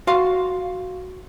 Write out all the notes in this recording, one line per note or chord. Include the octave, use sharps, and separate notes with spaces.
F#4 F5 C6